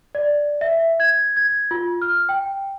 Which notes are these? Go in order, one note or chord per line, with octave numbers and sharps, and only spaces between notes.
D5
E5
G#6
G#6
F4
F6
G5